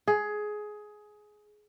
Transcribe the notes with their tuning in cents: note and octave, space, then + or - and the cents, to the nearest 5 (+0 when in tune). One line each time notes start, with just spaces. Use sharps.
G#4 +15